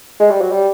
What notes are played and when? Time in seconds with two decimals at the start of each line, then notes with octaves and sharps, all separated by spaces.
0.20 G#3
0.30 G3
0.41 F#3
0.52 G3